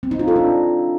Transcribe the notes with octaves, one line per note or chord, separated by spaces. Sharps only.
C4
D#4
F4
A4
D4